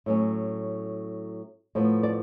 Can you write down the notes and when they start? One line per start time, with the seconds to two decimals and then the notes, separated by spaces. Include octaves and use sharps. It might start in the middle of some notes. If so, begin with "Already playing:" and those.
0.06 A2 F#3 C#4
1.75 A2 F3 B3
2.03 D5